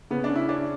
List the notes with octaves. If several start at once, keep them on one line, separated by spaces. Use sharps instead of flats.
C#3 B3
D4
C#4
E4
C#4 D4